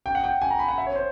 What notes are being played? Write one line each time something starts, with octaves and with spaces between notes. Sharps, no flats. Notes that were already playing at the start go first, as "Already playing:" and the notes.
G5
F#5
G5
G#5
A#5
B5
F#5
E5
C#5
C5